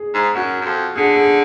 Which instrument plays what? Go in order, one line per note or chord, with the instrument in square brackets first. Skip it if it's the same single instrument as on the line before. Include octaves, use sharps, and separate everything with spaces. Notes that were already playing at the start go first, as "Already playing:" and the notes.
Already playing: [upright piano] G#4
[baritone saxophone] G#2
[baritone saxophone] F#2 [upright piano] F#4
[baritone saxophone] F#2
F2
[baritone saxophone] D3 [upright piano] G#4
[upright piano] G#4